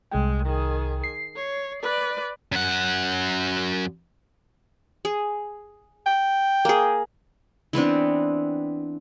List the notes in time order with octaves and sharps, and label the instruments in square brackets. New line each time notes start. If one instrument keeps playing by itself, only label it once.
[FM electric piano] C2 G5 [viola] G#3
[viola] D#3 G#4
[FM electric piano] C7
[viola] C#5
B4 D5
[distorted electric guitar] F#2 F#5
[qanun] G#4
[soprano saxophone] G5
[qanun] A#3 G#4
E3 B3 C4 D4